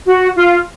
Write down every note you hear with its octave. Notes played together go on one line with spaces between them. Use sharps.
F#4
F4